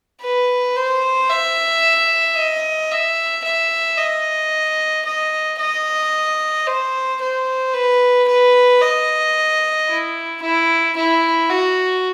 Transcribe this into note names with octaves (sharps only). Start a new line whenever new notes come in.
B4
C5
E5
D#5
E5
E5
D#5
D#5
D#5
C5
C5
B4
B4
D#5
E4
E4
E4
F#4